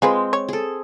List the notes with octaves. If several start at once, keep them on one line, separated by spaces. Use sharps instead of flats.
G#3 C4 F4 G#4 B4
C#5
G#4 A4